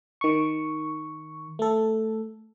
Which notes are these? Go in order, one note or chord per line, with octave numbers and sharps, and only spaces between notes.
D#3 C#6
A3 A4